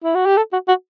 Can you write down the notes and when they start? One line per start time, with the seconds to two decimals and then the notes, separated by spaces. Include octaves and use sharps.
0.04 E4
0.15 F#4
0.26 G4
0.37 A4
0.53 F#4
0.68 F#4